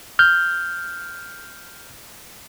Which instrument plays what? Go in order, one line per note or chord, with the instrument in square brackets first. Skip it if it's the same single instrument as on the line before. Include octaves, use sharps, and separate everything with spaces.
[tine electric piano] F6 G6